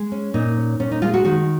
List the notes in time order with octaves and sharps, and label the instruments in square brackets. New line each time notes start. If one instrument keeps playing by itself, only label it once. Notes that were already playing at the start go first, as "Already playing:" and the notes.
Already playing: [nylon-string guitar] G#3
C#4
A#2 D#4
C#4
A#2 C#4
D#4
G#3 F4
F#4
D#3 F#4